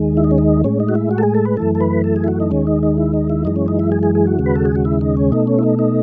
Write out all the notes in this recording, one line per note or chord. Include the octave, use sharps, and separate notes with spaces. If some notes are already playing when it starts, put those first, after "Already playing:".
Already playing: D#2 D#3 G#3
E4
D#4
C#4
D#4
A2 G#3 C#4
D#4
F#4
E4
F#4
A4
G#4
A4
B4
F#2 E3 A3 A4
A4
B4
A4
G#4
E4
F#4
D#4
D#2 D#3 G#3 C#4
D#4
D#4
E4
D#4
E4
F#2 E3 G#3 D#4
C#4
D#4
E4
G#4
G#4
G#4
F#4
D#2 C#3 G#3
B4
A4
G#4
F#4
E4
D#4
C#4
B2 A3 D#4
C#4
E4
D#4
D#4